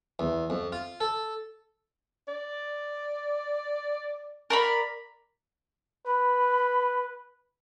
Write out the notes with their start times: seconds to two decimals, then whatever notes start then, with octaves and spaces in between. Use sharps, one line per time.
0.19 E2
0.50 F2
0.72 F4
1.01 A4
2.28 D5
4.50 A#4 D5 B5
6.06 B4 B5